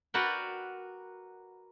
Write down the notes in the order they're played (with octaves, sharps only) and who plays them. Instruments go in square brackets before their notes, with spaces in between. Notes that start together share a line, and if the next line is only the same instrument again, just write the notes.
[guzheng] F#4 A#4 B4 D5 F#5 G5